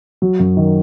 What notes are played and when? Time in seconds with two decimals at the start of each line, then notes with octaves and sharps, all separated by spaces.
0.22 F#3
0.40 F#2
0.57 D#3